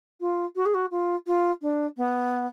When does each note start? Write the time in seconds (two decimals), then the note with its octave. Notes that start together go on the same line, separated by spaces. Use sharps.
0.20 F4
0.55 F#4
0.65 G#4
0.74 F#4
0.90 F4
1.26 F4
1.61 D4
1.97 B3